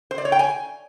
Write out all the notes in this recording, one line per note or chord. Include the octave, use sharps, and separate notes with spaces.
C5
D5
C#5
G5
G#5